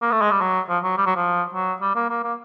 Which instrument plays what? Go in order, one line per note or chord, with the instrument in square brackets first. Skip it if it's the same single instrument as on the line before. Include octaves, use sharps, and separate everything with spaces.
[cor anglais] A#3
A3
G#3
G3
F#3
F3
F#3
G3
F#3
F3
F#3
G3
A#3
A#3
A#3